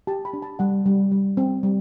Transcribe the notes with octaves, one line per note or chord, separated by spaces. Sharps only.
G4 A5
B5
D4
A5
G3 F#5
G3
G3
C4
G3